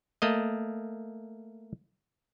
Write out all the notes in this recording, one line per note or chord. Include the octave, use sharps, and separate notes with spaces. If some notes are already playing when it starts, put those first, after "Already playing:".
A3 A#3 D#5